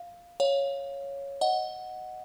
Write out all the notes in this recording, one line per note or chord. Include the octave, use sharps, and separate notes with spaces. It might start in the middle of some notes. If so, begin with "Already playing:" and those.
Already playing: F5
C#5 F5
D#5 F#5